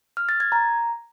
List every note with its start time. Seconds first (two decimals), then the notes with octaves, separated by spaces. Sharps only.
0.17 F6
0.29 A6
0.40 G#6
0.52 A#5